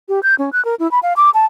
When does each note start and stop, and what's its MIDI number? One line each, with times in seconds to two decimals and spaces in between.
0.09 0.20 67
0.23 0.35 91
0.39 0.50 61
0.53 0.63 90
0.65 0.75 70
0.79 0.90 64
0.91 0.99 83
1.03 1.13 77
1.17 1.30 86
1.34 1.45 81